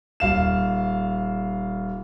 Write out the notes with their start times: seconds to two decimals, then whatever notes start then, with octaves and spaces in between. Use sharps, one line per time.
0.20 D#1 F5 E7